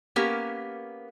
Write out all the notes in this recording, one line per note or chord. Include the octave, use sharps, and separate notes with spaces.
A#3 B3 C#4 G4 A#4